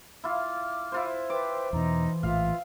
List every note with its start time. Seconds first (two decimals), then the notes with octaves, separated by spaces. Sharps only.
0.24 E4 F4 D6 F6
0.92 E4 F4 C5
1.30 B4 C5 G5 D6
1.73 E2 B2 E3 D#4 A#5
2.23 A#1 A2 F4 E5 F5